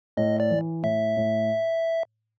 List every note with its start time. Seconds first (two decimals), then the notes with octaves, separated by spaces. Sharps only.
0.17 A2 D#5
0.40 D5
0.51 E3
0.83 A2 E5
1.17 A2